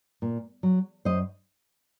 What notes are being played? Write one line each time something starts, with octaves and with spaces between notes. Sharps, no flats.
A#2
F#3
F#2 C5 D#5